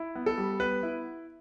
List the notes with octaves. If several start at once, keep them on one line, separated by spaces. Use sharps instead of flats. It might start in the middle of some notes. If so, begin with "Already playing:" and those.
Already playing: E4
B3
A4
G3
B3 B4
E4